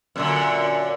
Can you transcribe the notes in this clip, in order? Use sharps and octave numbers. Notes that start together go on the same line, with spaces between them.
F#2 A#2 D3